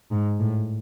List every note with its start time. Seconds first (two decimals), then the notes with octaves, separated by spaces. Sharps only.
0.11 G#2
0.40 A2